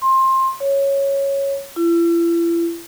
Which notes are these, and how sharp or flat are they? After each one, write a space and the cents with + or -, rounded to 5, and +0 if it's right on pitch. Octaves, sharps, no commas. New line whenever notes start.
C6 +20
C#5 -5
E4 +40